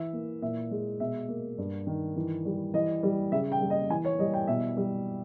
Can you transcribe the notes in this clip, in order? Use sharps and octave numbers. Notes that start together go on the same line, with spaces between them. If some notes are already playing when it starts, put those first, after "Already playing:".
Already playing: E3 E5
A#3
A#2 E5
G#3
B2 E5
A#3
G2
D#3
E3
G3
E3 D#5
G3
C#3 E5
G5
G3
D#5
E3 G#5
C#5
G3 D#5
G5
B2 E5
G3